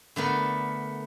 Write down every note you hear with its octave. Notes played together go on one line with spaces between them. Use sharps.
D3 A3 B3 A#4